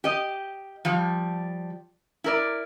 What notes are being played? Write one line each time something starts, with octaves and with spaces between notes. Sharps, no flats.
G4 D#5
F3 G3
E4 A#4 D5